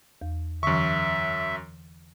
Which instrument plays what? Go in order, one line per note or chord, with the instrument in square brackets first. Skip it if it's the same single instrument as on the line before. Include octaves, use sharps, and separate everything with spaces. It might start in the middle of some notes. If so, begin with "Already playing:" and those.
[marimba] E2
[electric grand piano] F#2 C#6 [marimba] D3 E3 [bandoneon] E5